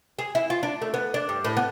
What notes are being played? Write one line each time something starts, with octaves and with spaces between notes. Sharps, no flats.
G#4
E4
F4
D4
A3
B3
D4
G2
A2
B3